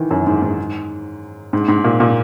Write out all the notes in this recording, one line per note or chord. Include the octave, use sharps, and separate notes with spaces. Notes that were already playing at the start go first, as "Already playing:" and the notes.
Already playing: D#3 E3
F#2
G#2
G#2
G#2
G#2
A#2
A#2